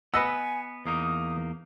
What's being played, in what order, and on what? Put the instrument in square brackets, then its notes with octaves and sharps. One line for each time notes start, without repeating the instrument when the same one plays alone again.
[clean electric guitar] B3 [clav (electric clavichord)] B4 D#5 F#5 [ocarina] G#5 [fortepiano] E6
[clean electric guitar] E2 A#3 D#4 [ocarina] D#6